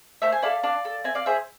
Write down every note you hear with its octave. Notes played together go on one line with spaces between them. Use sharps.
A3 C5 E5
G#5
E4 A4 D5 F5
D4 D5 F5
A4
C4 E5 G#5
D5 F5
G#4 C5 E5